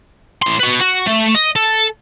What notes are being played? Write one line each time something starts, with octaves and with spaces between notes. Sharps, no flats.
A2 C6
F#4 B4
F#4
A3
D#5
A4